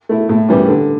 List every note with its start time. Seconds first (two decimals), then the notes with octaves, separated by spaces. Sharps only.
0.09 A3 E4
0.29 A2
0.49 E3 G3 C#4
0.69 D3